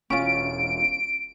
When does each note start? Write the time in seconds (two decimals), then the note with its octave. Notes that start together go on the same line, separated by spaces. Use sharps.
0.10 E1 C#4 F4 D7